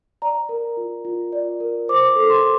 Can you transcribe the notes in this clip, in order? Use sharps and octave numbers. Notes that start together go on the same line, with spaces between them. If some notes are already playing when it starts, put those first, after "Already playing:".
D5 A#5
A#4
F4
F4
D5
A#4
C5 D6
A4
C6